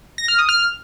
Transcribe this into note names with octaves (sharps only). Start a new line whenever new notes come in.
A#6
F6
D#6
F6